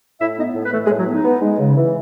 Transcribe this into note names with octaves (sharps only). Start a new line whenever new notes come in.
A2 E4 E5
B3 D#4 D#5
A2
B4
E3 A3 A4
G#3 G#4
A2
F#3 F#4
B3 D#4
B3
G#3
C#3
E3